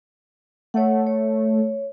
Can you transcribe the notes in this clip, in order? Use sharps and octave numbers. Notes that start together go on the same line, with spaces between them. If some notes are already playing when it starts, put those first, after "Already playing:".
A3 C#5 F#5
C#5